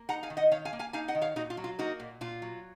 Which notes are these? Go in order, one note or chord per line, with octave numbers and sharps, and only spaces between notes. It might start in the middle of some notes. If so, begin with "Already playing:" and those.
Already playing: A#3
D#4 F#5 A#5
F5 G#5
D#3
D#5 F#5
D#3 C#5 F5
F5 G#5
A#3
F5 G#5
D#4 F5 G#5
D#5 F#5
D#3
C#5 F5
A#2 D#4 F#4
F4
F#3
F4
A#3 D#4 F#4
A#2
A#2 F4
F#3